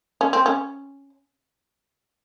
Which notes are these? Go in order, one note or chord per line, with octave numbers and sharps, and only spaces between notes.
C#4
C4
C#4